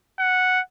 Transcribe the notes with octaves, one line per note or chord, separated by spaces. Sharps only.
F#5